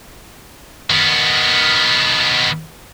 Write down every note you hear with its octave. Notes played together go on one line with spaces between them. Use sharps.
D#3 B3